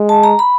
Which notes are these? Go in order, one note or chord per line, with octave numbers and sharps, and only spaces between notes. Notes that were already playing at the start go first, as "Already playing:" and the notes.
Already playing: G#3
A5
A#5
B5